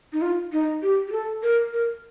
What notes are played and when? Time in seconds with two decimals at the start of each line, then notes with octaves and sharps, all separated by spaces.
0.13 D#4
0.22 F4
0.53 D#4
0.83 G4
1.08 G4
1.12 A4
1.43 A#4
1.73 A#4